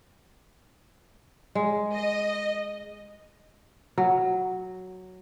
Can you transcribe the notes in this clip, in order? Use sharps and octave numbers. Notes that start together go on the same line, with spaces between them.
G#3
D#5
F#3